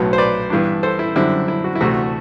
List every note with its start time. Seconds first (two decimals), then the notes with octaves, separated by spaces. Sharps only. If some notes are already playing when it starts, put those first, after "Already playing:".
Already playing: B1 A2 F#3 B3
0.13 C5
0.18 B4 D5
0.50 G2 E3 B3 D4
0.83 A4 C5
0.99 E4
1.16 F#2 D3 G3 C4 E4
1.48 E4
1.64 F#4
1.75 E4
1.81 D2 C3 E3 A3 F#4